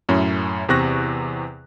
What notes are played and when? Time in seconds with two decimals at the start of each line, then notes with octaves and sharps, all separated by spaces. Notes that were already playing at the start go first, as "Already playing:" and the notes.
0.09 F#2 A2 C#4 E4
0.69 E2 C3 C4 C#6 F#6 A#6